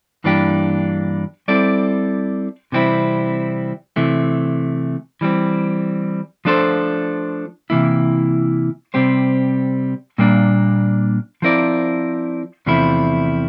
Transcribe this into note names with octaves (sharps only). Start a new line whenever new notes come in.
G2 E3 A#3 D4 G4
G3 C4 E4 A4 D5
C3 E3 G3 C4 E4
C3 E3 A3
E3 G3 C4
F3 A3 D4 A4 C5
C3 E3 A#3 E4
C3 G3 C4 G4 C5
A#2 G3 A#3 D4
F3 C4 E4 A#4 D5
E2 C3 F3 A3 E4